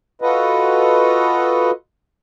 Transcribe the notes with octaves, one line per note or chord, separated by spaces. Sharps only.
F4 F#4 A4 B4 D#5